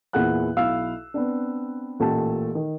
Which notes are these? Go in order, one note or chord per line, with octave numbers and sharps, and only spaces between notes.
E2 A#2 E4 G#4 F#5 F#6
B1 E4 F5 E6
B3 C4 D4
A1 A#2 A3 G4 A5
D#3